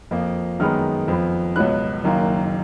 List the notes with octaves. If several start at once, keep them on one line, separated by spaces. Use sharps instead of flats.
F2 F3 A#3
F#2 D#3 G#3 B3 F6
F2 F3 B3
C#2 B2 F#3 B3 F#6
F#1 F#2 D#3 A#3